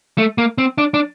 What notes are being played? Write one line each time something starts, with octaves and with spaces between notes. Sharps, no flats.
A3
A#3
C4
D4
D4